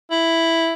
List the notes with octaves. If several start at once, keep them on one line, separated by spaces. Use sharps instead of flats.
E4